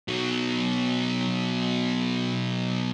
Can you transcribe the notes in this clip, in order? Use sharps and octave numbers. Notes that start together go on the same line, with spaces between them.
B2 F#3